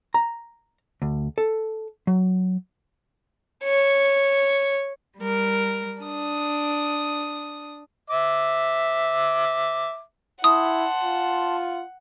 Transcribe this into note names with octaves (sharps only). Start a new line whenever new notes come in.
A#5
D2
A4
F#3
C#5
G3 A#4
D4 D#6
E5 D6
E4 F#5 A5 C6 D#6
F4